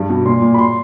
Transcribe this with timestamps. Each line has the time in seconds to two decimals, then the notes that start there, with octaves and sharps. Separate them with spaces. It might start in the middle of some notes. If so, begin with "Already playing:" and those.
Already playing: G2 G3
0.10 B2
0.25 A#2 C6
0.42 A#2
0.54 B5
0.59 C6